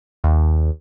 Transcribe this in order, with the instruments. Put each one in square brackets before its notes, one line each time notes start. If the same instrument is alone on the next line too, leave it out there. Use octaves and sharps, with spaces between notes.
[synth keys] D#2